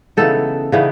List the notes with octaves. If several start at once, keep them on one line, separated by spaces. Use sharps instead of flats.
C#3 E3 B3 D#4 A4
C#3 E3 B3 D#4